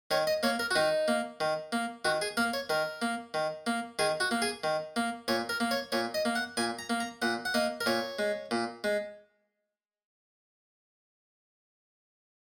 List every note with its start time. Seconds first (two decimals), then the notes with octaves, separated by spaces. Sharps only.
0.11 D#3 C#5
0.27 D#5
0.43 A#3 C#5
0.59 A#4
0.71 F#4
0.76 D#3 D#4
1.08 A#3
1.40 D#3
1.72 A#3
2.05 D#3 F#4
2.22 G#4
2.37 A#3 A#4
2.53 C#5
2.69 D#3 A#4
3.02 A#3
3.34 D#3
3.67 A#3
3.99 D#3 G#4
4.20 F#4
4.31 A#3
4.42 G#4
4.64 D#3
4.96 A#3
5.28 A#2 C#5
5.49 A#4
5.60 A#3
5.71 C#5
5.92 A#2 C#5
6.14 D#5
6.25 A#3
6.35 F#5
6.57 A#2 G#5
6.79 A#5
6.90 A#3
7.00 A#5
7.22 A#2 F#5
7.45 F#5
7.54 A#3 D#5
7.81 A#4
7.86 A#2 C#5
8.19 G#3
8.51 A#2
8.84 G#3